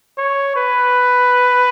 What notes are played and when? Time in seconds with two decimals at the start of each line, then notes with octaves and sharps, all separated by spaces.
0.18 C#5
0.56 B4